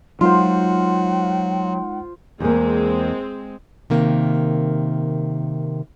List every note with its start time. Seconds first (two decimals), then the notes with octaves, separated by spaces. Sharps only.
0.21 F#3 G#3 D#4 F4 C5 F#5
2.40 E2 G#3 A#3 C4
3.90 C3 D#3 A#3